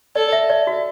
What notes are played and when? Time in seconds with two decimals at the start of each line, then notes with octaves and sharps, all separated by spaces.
0.15 A4 D5
0.33 E5
0.50 D5
0.67 F#4